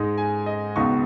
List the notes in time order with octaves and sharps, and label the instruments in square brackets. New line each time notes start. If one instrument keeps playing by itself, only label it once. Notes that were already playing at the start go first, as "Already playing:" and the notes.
Already playing: [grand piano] G#2 G#3 D#4
G#5
D#5
C#2 B2 B3 D#4 C#6